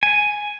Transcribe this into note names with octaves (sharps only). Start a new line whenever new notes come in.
G#5